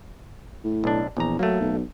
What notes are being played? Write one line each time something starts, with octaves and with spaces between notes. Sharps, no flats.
A2
B1 D4
A#1 E2 A#5
F#3 A3 A#3
B1